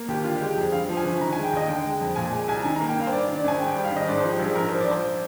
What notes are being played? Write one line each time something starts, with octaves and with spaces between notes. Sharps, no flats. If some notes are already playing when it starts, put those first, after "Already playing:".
Already playing: A#3
D#2 G4
D3 F4
G4
G#3
G4
F2 G#4
G2 F5
F3
G#5
G1
D#3 A#5
G#3 G#5
G5
D#2 D#5
D3 G5
G#3
F2
A#2 G#5
G#3 G#5
C2 G#5
A#5
D#3 G#5
A#3 A#5
G5
G2 F5
C5
G2 D5
D#3
D5
G#1 G#5
G#2 G5
G3 G5
F5
G#1 D#5
G#2 D5
F3 C5
G4
A#1 G#4
G#2 A#4
F3 C5
D5
A#1 C5